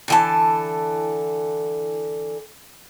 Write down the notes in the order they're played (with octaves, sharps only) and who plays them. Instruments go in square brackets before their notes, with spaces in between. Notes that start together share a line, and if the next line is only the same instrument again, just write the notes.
[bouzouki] D3 E3 A5